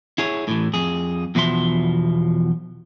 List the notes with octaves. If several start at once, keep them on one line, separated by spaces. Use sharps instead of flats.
E4 G#4 C#5
A2 E3
F2 G#4
E2 B2 F3 E5 C6